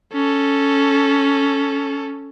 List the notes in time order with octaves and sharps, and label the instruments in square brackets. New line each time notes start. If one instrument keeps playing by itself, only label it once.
[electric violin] C#4 A4